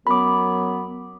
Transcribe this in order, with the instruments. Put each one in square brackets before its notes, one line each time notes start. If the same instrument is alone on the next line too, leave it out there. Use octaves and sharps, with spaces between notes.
[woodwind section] F#2 F#3 B3 [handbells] B5 D6